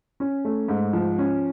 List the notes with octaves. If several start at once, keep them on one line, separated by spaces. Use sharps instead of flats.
C#4
A3
G#2
F3
C#4